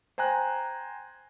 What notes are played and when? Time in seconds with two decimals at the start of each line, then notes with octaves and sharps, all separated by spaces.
0.18 C5 G5 G#5 A#5 F#6